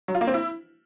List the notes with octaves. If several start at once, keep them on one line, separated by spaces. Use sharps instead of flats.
F#3
F4
A#3
C4
E4